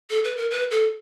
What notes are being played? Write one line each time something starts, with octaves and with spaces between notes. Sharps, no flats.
A4
B4
A#4
B4
A4